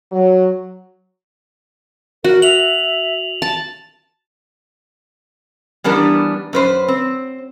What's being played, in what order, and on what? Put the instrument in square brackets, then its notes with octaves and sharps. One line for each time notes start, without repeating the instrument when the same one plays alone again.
[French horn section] F#3
[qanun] F#4 [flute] A#4
[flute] E5 [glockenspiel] F7 F#7
[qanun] A5
[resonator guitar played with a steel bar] E3 G3 B3 D4 A#4
F#2 B4 C5
C4